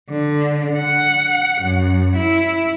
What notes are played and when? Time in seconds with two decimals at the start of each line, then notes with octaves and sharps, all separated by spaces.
0.10 D3
0.78 F#5
1.62 F#2
2.17 E4